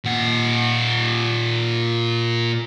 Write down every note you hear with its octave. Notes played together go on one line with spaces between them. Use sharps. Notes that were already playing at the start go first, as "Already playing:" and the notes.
A#2 F#5